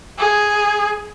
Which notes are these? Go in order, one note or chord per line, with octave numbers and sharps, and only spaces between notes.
G#4